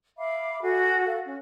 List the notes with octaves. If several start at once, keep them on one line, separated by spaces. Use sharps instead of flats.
E5 F5 B5 D6
F#4 A4 G#5
A4 F5
C#4